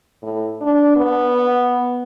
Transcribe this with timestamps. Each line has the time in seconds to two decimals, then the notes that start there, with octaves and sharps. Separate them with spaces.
0.23 A2
0.61 D4
0.96 B3